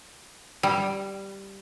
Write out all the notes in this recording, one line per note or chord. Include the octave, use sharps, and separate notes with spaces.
G3